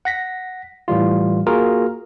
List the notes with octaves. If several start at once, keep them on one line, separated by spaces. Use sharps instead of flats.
F#5 A#6 B6
A2 E3 G3 F4
A#3 F4 F#4 G#4 A#4